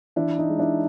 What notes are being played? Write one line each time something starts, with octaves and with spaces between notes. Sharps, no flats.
E3 D4 E4
D#4
G#3
D4 E4